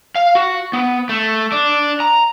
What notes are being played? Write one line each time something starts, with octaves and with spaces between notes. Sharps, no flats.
F5
F#4
B3
A3
D4
A#5